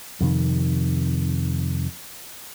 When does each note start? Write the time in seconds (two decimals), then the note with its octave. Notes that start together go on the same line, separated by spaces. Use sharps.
0.21 F2 C3 D#3